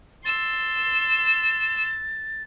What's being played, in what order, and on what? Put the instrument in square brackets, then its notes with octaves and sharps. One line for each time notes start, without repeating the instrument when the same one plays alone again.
[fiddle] C6 E6 [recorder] A6